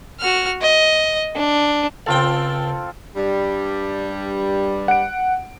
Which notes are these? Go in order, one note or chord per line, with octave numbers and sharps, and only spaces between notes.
F#4 F6
D#5
D4
C#2 C4 F4 A4 G5
G2 G3
F#5 D7